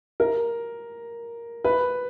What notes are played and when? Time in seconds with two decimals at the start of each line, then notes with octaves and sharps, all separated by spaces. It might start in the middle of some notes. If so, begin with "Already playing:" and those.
0.20 A#4
1.64 B4